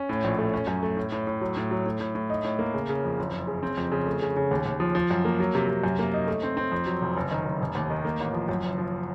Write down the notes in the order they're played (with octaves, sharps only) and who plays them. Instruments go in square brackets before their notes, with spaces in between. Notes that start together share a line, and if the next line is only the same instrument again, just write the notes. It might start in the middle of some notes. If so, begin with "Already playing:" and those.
Already playing: [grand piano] C#4
A2
A#1
A3
C#4
F#2
A3
A2
A2
A2
F#3
A2
F#3
A2
A2
A2
D#4
A2
A#3
C#3
C#3
F2
F#1
F#1
C#3
C4
F2
C#3
A3
C#3
C#3
D#2
D#2
F3
F3
F#2
A#3
F#3
C3
C3
F#2
A#3
D#4
A3
C4
C4
F2
F#3
F1
F#1
D#3
F#1
F1
D#2
D#3
A#3
A1
F3
F#2
F#1
F3